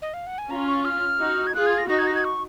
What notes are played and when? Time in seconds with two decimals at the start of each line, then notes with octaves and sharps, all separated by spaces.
0.02 D#5
0.14 F5
0.27 F#5
0.38 G#5
0.50 C#4 F4 A#5
0.67 C#6
0.85 F6
1.20 D#4 F#4
1.47 G#6
1.55 F4 G#4 F#6
1.66 G#6
1.78 A#6
1.89 D#4 F#4 A#6
1.99 G#6
2.07 A#6
2.15 G#6
2.25 C#6